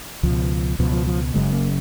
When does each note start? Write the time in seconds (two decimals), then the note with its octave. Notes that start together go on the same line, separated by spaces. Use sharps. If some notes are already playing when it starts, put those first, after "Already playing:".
0.23 C#2 B2 F3
0.79 C#2 B2 F3
0.92 F3
1.07 F3
1.34 F#1 F#2 C#3 G#3
1.52 A#3